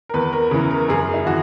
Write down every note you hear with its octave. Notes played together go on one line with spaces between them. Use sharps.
A#4
E2 B4
A#4
C#3 E3
A#4
F#2 G#4
E4
E3 F#4